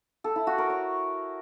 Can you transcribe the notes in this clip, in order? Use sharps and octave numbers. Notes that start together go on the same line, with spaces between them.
A4
E4
F#4
A#4
C#5